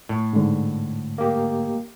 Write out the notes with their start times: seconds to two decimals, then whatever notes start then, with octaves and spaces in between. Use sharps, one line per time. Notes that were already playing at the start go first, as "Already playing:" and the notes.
0.09 A2
0.33 G#2 D3
1.18 A#3 G4